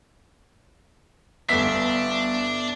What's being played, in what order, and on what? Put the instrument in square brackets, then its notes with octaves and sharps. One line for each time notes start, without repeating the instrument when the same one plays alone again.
[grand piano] G1 B6 [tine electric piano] B3 E5 [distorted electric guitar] D4